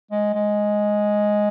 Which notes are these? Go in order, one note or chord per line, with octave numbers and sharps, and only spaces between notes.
G#3
G#3